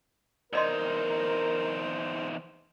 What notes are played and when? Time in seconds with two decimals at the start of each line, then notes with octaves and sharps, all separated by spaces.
0.53 E2 D#4 A#4 C5 D5 D#5 C6